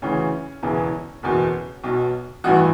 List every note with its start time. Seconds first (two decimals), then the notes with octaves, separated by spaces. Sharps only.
0.02 D2 C#3 E3 C#4
0.63 E1 E2 C#3 E3
1.23 F#1 E2 B2
1.84 B1 B2
2.44 A1 G2 E3 F#4